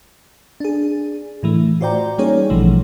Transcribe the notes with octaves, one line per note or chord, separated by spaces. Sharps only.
D4 G#4
A2 E3 A3
F4 F#4 C5 D5 G5 A#5
G3 A#3 C#4 D#4 G#4 C#5
A#1 B2 E3 F3 G3 A3